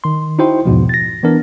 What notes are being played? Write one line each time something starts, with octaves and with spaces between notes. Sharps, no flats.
D#3 C6
D#4 E4 F#4 C5 G5 C6
E2 G#2 B2 F3
A6 A#6
E3 B3 D4 A#4